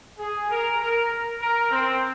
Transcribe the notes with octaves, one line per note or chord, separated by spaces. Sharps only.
G#4
A#4
A#4
A#4
C4